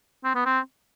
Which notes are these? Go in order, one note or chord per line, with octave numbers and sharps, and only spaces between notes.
C4
B3
C4